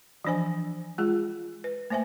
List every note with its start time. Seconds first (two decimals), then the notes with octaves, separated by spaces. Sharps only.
0.25 E3 F3 D4 C5 G#5
0.98 G#3 F4 G#4
1.64 B4
1.90 A3 A#3 C5 E5 G#5